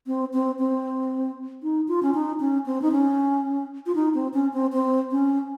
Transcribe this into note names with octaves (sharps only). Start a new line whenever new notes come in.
C4
C4
C4
D#4
F4
C#4
D#4
C#4
C4
D#4
C#4
F4
D#4
C4
C#4
C4
C4
C#4